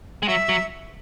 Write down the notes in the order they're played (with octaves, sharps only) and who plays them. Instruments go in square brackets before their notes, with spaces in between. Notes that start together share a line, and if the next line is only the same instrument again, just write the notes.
[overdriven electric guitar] G#3
[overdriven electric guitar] F#3 [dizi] E5
[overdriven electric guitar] F#3